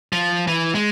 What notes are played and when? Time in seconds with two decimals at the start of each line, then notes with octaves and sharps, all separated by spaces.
0.13 F3
0.47 E3
0.75 G#3